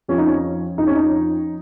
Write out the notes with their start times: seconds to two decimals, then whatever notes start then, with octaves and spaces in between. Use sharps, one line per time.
0.08 F2 F3 C#4
0.18 D#4
0.27 C#4
0.78 F2 D#4
0.82 F3 C#4
0.95 D#4